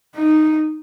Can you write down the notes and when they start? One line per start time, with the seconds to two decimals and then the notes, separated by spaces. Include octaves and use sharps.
0.16 D#4